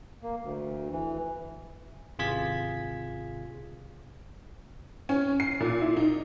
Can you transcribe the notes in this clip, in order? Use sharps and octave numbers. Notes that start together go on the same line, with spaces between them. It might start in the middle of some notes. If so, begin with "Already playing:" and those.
A#3
D2
E3
G#1 C3 F4 G#4 G#6 B6
C#4
C7
A#2
E4
D#4